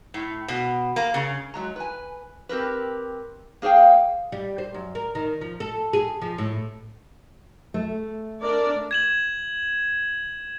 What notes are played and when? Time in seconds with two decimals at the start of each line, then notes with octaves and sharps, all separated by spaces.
0.14 A2
0.48 B2
0.96 A#3
1.14 C#3
1.54 F#3 G#3 A#5
1.76 B4 G#5
2.49 C4 G4 A#4 B4
3.62 A#3 G#4 C5 F5 G5
4.32 G3
4.58 C5
4.74 F#2
4.95 A#4
5.15 D#3
5.41 F3
5.60 A4
5.93 G#4
6.22 F3
6.38 A2
7.74 A3
8.41 D4 A#4 D5
8.91 G#6 E7 F#7